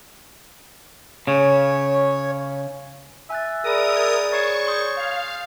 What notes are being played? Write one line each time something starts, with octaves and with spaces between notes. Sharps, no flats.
C#3 C#5
E5 G#5 F#6 A6
G#4 A#4 D5 B5 D#6
G#6 A6
C#5 C#6 A6 C7 E7
C#5 C6 D#6 G6
F5